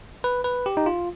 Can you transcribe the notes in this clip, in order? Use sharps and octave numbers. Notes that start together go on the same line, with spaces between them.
B4
B4
G4
D#4
F4